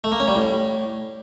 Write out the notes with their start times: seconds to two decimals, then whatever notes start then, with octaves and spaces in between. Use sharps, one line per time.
0.04 A3
0.12 A#3
0.20 C#4
0.28 G3
0.36 A2